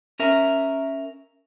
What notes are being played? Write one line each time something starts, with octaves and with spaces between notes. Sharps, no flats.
C#4 A#4 E5